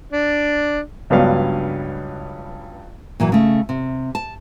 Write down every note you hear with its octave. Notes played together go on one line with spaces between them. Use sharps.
D4
C#2 G2 F#3 B3 D4 F5
A#2 E3 F#3
C#3 A3
C3
A5